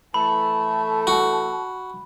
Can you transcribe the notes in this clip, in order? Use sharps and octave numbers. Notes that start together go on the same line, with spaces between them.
E3 A3 A5 B5
F#4